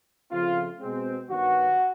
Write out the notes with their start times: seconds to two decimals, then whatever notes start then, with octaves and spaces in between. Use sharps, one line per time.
0.31 C#3 F3 A3 C4 F4
0.80 B2 G#3 C4
1.29 G2 D#3 F#3 B3 F#4